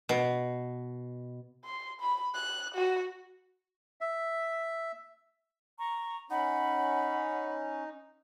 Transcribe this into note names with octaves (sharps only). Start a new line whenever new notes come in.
B2
C6
B5
F#6
F#4
E5
A#5 C#6
C#4 D#4 F#5 B5